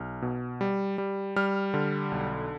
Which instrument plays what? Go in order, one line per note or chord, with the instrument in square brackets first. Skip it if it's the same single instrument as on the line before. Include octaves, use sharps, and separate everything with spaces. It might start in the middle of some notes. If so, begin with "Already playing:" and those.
Already playing: [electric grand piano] B1 F6
B2
G3
G3
G3 F6
D3
B1